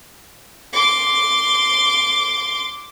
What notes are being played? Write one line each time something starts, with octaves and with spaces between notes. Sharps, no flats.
C6 D6